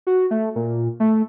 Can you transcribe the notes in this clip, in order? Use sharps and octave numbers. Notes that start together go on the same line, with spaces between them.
F#4
A3
A#2
A3